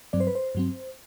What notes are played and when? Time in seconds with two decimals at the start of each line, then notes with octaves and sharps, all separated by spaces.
0.13 G2 F#3 C4 D5
0.20 C5
0.27 B4
0.35 C5
0.55 G2 F#3 C4